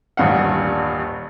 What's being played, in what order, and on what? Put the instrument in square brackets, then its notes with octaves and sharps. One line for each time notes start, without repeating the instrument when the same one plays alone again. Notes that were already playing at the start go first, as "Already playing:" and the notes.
[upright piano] D#1 A1 G2 F5 F#5